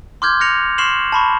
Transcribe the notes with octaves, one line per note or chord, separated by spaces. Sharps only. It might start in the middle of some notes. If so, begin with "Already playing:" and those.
C6 D6 F6 G6 G#6
F6 F#6 A#6 C#7 F7
C6 C#6 F6 C7 E7 F#7
A5 B5 C#6